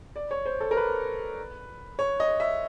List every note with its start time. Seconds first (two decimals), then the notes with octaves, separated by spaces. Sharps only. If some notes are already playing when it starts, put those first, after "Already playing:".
0.16 D5
0.31 C#5
0.46 C5
0.61 A4
0.71 A#4
0.77 B4
1.99 C#5
2.20 D#5
2.40 E5